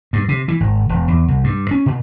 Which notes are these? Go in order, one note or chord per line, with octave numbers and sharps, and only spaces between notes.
G2
C3
E3
G#1
E1
E2
C2
G2
C#4
A#2